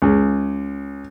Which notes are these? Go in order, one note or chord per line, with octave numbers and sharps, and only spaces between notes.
C#2